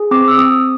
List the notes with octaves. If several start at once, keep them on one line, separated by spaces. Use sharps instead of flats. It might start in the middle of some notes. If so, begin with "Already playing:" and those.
Already playing: G#4
C4 D6
E6
C4 D#6